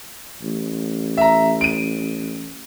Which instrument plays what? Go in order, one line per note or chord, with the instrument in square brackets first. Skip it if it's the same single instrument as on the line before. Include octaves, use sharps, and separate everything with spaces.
[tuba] A1
[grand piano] E5 A#5
D7 D#7